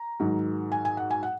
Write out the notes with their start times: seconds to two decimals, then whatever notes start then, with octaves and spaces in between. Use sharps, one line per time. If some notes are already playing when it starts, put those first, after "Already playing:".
Already playing: A#5
0.20 G#2 D#3 F#3
0.72 G#5
0.85 G#5
0.97 F#5
1.11 G#5
1.23 F#5